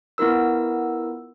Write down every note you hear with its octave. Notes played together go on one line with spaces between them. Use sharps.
B3 E4 F4 A#4 E6